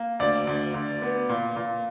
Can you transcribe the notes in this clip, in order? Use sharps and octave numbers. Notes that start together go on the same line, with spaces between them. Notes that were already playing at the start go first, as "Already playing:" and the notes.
Already playing: A#3
D2 D5
D2
D2
B3
A#2
A#2